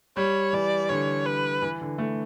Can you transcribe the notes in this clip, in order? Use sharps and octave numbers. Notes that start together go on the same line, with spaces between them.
G3 C#5
E3 D5
D3 C#5
B4
E3
D3
A3